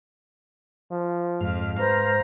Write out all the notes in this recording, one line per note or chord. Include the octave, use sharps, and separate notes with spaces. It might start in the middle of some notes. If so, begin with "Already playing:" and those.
F3
F2 G#2 F5
B4 C5 A#5